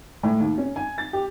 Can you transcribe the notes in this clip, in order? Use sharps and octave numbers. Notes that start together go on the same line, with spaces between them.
A2
D#2
C#4
G#5
A6
G4